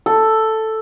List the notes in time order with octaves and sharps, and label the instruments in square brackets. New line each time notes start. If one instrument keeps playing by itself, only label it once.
[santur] A4